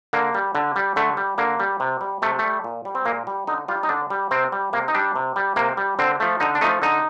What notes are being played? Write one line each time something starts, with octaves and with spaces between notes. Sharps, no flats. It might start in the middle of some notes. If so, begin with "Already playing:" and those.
D3 A#3
G3
D3
G3
D3 A3
G3
D3 A#3
G3
C3
G3
C3 A3
G3 A3
A#2
G3
C4
A#2 A#3
G3
D3 D#4
G3 F4
D#4
D3 D4
G3
C3 C4
G3
C3 A#3
D#4
G3 D4
C3
G3
C3 A#3
G3
D3 C4
F3 A3
D3 D#4
D4
F3 A3 D#4
D3 D#4